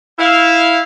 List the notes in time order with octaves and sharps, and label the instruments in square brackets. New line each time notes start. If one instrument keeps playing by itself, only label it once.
[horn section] E4 F5